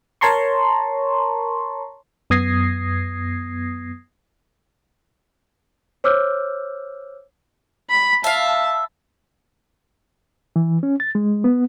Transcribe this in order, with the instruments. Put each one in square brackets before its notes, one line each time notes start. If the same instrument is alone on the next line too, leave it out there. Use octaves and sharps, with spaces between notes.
[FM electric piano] A#4 C#5 A5 A#5 C6 C#6
F#2 B3 D#6 G#6 A#6 C7
[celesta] C5 C#5 D6 E6 F6 G6
[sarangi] B5
[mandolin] E5 F5 [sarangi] A5
[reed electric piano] E3
C#4
A6
G#3
B3